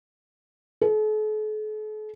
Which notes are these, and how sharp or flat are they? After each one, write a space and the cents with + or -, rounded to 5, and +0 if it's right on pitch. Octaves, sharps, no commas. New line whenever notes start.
A4 -45